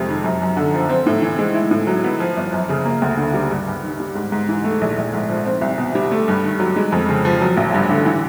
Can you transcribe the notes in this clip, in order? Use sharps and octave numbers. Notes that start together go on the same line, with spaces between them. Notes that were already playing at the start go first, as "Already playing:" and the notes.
Already playing: F2 C3 G3 G#3
D#3
F#2
F#2
D3
F3
C4
A2
E3
G#3
E4
A2
F#3
B3
F3
G1
F#2
C#3
A#3
D2
D3
G3
G2
G2
D#3
G3
G#2
G#2
E3
A3
A#1
A#1
G#2
F3
C4
C2
B2
G3
A3
G2
D#3
F#3
G#3
F2
C#3
F3
F#3
A1
G2
D3
E3